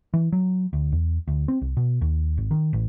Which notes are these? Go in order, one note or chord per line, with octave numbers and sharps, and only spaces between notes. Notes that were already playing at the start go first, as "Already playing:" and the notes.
E3
F#3
D2
E2
D2
C4
C2
B2
D#2
G#1
D#3
A1